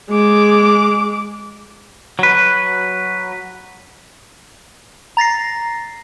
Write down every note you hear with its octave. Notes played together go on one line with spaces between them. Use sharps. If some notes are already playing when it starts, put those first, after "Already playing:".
G#3 D6
F#3 B4
A#5 A6 A#6 C7